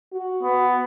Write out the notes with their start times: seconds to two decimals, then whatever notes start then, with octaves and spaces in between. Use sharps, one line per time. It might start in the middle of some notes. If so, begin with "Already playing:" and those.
0.13 F#4
0.43 B3